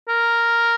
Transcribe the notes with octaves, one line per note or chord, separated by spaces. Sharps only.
A#4